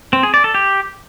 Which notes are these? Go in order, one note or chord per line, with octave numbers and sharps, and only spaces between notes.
C4
G#4
D5
A4
G4